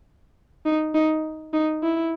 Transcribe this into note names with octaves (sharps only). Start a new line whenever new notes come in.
D#4
D#4
D#4
E4